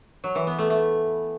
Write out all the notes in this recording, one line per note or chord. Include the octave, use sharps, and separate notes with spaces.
F#3
E3
B3
A3
A3